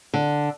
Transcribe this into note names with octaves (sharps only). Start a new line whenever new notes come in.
D3